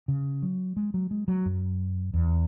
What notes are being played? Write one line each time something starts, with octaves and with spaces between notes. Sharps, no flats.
C#3
F#3
G#3
F#3
G#3
F#3
F#2
E2